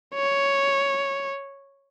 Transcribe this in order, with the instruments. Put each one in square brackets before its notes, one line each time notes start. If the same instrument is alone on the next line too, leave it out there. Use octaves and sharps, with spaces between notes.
[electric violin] C#5